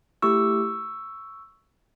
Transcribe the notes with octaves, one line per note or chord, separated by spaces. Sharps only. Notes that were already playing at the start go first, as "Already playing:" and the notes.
A3 E4 G4 C#6 E6